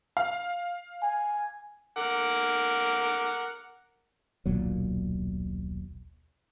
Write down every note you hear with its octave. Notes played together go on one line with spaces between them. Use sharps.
F5
G#5
A#4 F#5 D6
D#1 B1 A#2 F#3